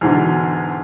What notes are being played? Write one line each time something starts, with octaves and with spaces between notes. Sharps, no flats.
E2 G#2 B2 D3